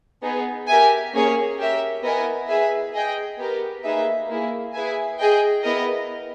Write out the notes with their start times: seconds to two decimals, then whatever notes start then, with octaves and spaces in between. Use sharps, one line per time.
0.22 B3 D#4 G#4
0.68 G4 A#4 E5 G#5
1.14 A#3 C#4 G#4 C#5
1.58 G4 A#4 E5
2.03 B3 E4 A#4 D#5 G#5
2.48 G#4 B4 E5 G#5
2.93 G#4 D#5 G5
3.38 B3 G4 A#4
3.84 A#3 D#4 G#4 B4 E5
4.28 A#3 E4 G#4
4.74 E4 G#4 B4 E5 G#5
5.19 G#4 D#5 G5
5.64 B3 E4 A#4 D#5